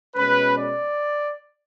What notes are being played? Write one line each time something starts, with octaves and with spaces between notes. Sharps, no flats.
B2 G#3 C#4 B4
D5